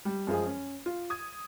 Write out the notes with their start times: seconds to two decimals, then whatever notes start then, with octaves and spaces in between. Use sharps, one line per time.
0.05 G3
0.27 F#2 F3 G#3 G#4
0.46 C#4
0.86 F4
1.10 D#6 G#6